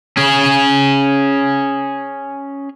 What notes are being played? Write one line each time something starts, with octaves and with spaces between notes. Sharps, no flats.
C#4 G#4